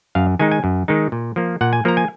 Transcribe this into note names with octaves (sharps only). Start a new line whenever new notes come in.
F#2 F5
D#3 G#3 D#4 G#5
G#5
F#2
D#3 G#3 D#4
A#2
F3 A#3
A#2 F#5
G#5
F3 A#3 A#5
G#5